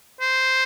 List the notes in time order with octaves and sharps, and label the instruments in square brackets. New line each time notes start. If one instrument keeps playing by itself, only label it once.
[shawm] C5